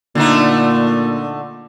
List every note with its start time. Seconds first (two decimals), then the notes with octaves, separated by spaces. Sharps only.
0.15 A#2 D3 A3 D#4